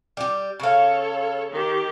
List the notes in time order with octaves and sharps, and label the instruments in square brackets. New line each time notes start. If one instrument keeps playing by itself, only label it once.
[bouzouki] G3 G4
[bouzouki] C#3 F5 [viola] A4 C#5
[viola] D#3 G4